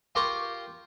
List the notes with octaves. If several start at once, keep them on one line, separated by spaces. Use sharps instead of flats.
F4 G4 A#4 A#5 C6 C#6